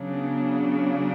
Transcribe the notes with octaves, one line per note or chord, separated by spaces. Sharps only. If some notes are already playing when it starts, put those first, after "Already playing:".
Already playing: C#3 F#3 B3 D4